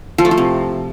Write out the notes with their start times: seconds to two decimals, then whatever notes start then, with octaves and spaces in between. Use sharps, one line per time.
0.18 F3
0.25 A3
0.31 F3
0.38 C3